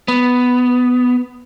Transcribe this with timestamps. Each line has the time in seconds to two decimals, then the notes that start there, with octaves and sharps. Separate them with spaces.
0.08 B3